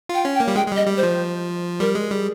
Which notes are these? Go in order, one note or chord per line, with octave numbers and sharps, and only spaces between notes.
F4 G5
C#4
G5
A#3
G3
G#3 G5
G#3
G3 D#5
G3
C5
F3
G3 A#4
G#3
G3 G#4